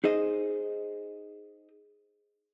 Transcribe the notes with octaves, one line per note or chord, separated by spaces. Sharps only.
D#4 G#4 C5 D#5